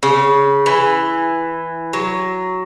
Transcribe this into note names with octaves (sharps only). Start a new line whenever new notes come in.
C#3
E3
F#3